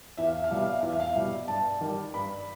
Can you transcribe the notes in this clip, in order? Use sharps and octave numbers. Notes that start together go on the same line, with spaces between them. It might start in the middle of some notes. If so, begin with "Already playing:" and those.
E2 E5
F5
E5
F5
B2 G3 E5
F5
E5
E2 F5
E5
F5
E5
B2 G3
G2 A5
D#3 G3
G2 B5